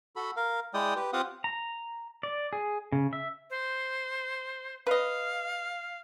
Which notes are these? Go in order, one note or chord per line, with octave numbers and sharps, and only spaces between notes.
F#4 A4 B5
A#4 F5
G#3 E4 D5 G5 D#6
G4 B4
C4 F4 G4 F5 F#5 D#6
A#5
D5
G#4
C#3
E5
C5
B4 D#5 F5